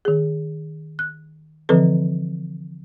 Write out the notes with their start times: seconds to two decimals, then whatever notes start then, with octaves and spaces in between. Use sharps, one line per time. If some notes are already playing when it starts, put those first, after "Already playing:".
0.05 D#3 G#4
0.99 F#6
1.69 D3 E3 F3 C4 A4 B4